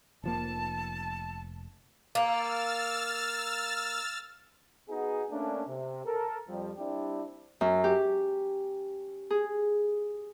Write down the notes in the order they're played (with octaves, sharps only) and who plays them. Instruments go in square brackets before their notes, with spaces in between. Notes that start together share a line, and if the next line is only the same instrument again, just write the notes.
[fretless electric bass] F1 F3 A#3 [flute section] A5
[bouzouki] A#3 [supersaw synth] E6 F6 A6
[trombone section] B3 D#4 F#4 G#4
A3 A#3 C#4 D4
C3
A4 A#4
F2 F3 G3
G3 C4 D4 E4 G4
[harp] F#2
G4
G#4